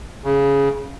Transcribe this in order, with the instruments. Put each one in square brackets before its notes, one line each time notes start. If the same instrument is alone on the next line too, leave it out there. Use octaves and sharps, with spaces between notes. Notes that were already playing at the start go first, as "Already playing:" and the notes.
[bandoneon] C#3